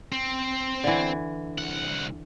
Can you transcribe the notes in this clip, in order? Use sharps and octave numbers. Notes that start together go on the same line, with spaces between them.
C4
D3 E3
C2 F#5